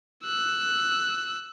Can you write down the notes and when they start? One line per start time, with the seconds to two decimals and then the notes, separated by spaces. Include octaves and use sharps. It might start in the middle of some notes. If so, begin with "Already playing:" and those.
0.24 E6 F#6